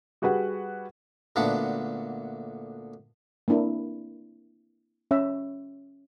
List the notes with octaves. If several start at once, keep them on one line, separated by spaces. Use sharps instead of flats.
G3 F#4 G#4 B4 F#5
D2 A#2 B3 D4 F#5 A5
A#3 C4 D4 E4 A#4
C#4 C#5 E5